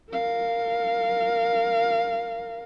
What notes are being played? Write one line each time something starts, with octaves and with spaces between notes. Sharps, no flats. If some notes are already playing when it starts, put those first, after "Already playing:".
A#4 F5